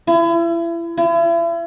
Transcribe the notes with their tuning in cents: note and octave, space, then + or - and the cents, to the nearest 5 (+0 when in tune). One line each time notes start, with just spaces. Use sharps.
E4 +35
E4 +40